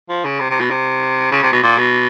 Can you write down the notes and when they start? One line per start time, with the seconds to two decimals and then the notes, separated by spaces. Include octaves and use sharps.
0.09 F3
0.24 C#3
0.40 C3
0.50 C3
0.60 B2
0.70 C3
1.32 C#3
1.42 C3
1.53 B2
1.63 A#2
1.78 B2